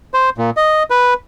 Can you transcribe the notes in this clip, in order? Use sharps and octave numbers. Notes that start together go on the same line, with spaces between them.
C5
A#2
D#5
B4